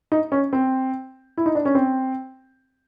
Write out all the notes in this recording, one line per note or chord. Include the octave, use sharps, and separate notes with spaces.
D#4
C#4
C4
E4
D#4
D4
C#4
C4